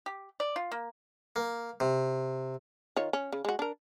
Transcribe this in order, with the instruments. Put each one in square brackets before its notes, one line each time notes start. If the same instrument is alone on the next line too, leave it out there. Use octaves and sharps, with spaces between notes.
[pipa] G4
D5
F4
A#3
[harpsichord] A#3
C3
[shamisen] D#3 F4 C#5
C#4
C#3
G#3 F#4
D4 A#4